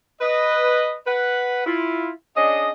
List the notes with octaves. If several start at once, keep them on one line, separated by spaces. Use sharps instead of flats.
B4 D#5
B4 F#5
E4 F4
C#4 D4 G#4 D#5